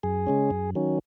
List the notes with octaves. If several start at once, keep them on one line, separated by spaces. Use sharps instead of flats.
F#2 G#4
C#3 G#3 C#4
F#2
D#3 F#3 C#4